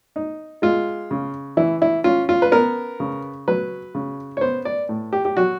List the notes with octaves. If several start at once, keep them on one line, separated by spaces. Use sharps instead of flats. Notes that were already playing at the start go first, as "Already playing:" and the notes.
D#4
G#3 F4
C#3
E3 E4
E4
C#4 F4
F4
B4
B3 A#4
C#3
F#3 B4
C#3
C#5
B3 C5
D5
A2
G4
G4
F#3 F#4